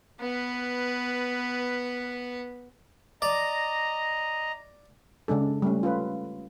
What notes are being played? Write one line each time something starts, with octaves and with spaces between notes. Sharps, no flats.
B3 B4
D5 D#5 A#5
C#3 G#3 D4 A4
G3 A3 C#4
F4 A4 B4 C#5